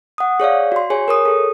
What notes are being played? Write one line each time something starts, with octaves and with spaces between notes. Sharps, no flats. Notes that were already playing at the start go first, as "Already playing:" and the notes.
F#5 D#6
G#4 C#5 D5 F5
F#4 C6
G#4 C#5 G#5
A#4 C#5 D#6
G#4 A4